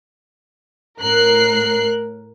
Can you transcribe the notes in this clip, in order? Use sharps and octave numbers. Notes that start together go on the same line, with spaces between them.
A2 A#4 F#6 C7